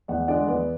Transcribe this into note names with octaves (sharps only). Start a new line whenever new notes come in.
E2 D5 F#5
D3 G#3 D5 F#5
E2 B4 D5